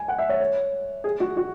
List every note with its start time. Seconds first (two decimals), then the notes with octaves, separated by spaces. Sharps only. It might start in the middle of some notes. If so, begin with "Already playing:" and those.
Already playing: G#5
0.08 F#5
0.18 E5
0.29 C#5
0.40 C#5
1.04 G#4
1.20 F#4
1.37 F#4